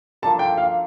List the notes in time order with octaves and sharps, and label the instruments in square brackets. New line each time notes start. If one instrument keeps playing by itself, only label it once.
[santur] F3 A#3 D4 A4 [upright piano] A5
[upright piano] G5
F5